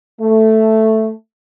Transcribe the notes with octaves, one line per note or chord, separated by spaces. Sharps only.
A3